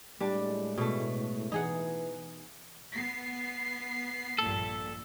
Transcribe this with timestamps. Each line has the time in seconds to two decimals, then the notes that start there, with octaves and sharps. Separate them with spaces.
0.20 A2 G3 G#3 D4
0.78 B2 A3
1.52 E3 D#4 G#4 F#5
2.93 B3 C7
4.39 A#1 G2 A#2 A4